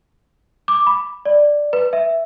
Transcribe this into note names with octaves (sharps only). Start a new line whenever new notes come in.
D6
B5
D5
B4
E5